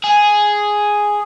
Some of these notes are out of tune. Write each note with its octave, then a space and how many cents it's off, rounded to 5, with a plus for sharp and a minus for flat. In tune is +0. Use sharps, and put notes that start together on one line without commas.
G#4 +0